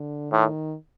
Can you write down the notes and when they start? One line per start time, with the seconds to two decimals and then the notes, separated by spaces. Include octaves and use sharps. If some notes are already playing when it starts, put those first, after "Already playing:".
Already playing: D3
0.31 A2 D#3